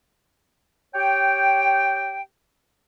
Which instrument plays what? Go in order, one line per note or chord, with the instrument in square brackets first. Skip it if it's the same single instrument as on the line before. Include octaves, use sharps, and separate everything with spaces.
[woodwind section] G4 C#5 G5